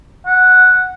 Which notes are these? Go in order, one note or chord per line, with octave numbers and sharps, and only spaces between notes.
F#5